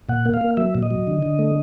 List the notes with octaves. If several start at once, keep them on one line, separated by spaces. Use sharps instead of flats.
A#2 F#5
A#3
F5
A#3
F#3 E5
A#2
D#5
F#3
D3
D3
A3